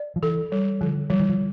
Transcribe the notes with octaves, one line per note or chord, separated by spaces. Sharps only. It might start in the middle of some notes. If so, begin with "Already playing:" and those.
Already playing: D5
F3
E3 A4
G3
D3 F3
F3 G3
E3
F3